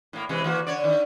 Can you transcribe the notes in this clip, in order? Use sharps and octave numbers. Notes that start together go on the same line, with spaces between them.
A2 A#3
C3 E3 G#3
E3 A#3 F#4
D3 C#5 D5
D#3